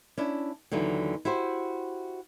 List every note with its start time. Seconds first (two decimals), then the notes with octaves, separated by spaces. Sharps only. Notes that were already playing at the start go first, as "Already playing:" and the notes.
0.18 C#4 D4 E4
0.72 D#2 D3 E3 F#3
1.25 E4 F#4 G4 C5